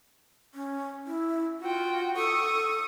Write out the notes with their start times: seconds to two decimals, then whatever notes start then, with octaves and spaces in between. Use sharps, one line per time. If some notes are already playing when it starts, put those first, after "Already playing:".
0.55 C#4
1.07 E4
1.61 F4 F#4 G5
2.16 A4 C#6 D#6